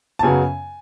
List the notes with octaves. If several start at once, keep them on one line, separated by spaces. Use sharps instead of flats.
A5
F#2 C#3 F#3 B3 G#5